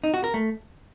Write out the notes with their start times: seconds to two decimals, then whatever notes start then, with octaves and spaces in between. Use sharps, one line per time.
0.04 D#4
0.14 F#4
0.24 A#4
0.34 A3